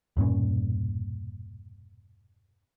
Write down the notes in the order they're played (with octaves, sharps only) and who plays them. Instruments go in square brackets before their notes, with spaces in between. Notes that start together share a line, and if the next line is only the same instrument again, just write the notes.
[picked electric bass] E1 G2 A#2 C#4